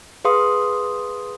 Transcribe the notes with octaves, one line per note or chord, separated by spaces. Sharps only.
G#4 B4 F5 C6 D#6